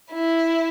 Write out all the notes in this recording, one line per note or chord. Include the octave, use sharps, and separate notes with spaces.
E4